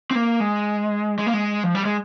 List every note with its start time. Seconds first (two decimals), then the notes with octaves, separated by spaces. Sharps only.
0.11 C4
0.15 A#3
0.40 G#3
1.19 G#3
1.27 A#3
1.33 G#3
1.64 F3
1.75 G3
1.85 G#3